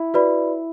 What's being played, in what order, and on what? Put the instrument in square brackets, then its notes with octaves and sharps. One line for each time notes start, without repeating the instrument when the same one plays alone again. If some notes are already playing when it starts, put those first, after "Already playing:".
Already playing: [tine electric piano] E4
[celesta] F#4 B4 D5 B5